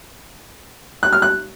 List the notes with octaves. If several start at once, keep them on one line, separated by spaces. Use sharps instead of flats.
F#6
F6
F#6